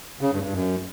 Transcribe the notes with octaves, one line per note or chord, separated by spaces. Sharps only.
C#3
G2
G2
F#2